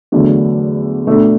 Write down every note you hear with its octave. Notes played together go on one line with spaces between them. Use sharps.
E2 D3 F#3 A3 D4
B2 A3 D4 A4